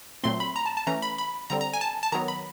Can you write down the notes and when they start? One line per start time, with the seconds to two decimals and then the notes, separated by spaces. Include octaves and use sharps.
0.24 A#2 F#3 A3 C4 C6
0.40 B5
0.56 A#5
0.66 A5
0.77 A5
0.87 E3 A3 C#4 A#5
1.02 B5
1.18 B5
1.50 D3 G3 C4 A#5
1.61 A#5
1.74 G#5
1.81 A5
2.03 A5
2.12 D#3 F#3 B3 A#5
2.28 B5